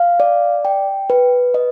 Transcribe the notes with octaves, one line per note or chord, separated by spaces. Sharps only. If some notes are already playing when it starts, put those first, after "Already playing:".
Already playing: F5
D5
G5
B4
D#5